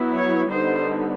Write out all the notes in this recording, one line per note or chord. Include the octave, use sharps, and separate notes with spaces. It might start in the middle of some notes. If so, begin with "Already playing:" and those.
Already playing: F#3 B3 E4
C#5
D3 G3 B3 D#4 C5